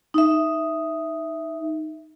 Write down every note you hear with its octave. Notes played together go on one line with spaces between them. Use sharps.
D#4 E5